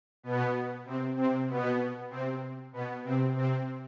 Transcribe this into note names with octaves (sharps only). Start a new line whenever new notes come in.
B2 B3
C3 C4
C3 C4
B2 B3
C3 C4
B2 B3
C3 C4
C3 C4